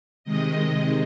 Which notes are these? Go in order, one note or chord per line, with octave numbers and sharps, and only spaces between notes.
C3 D#3 G#3 D#5